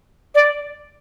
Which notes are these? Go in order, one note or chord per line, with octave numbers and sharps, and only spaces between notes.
D5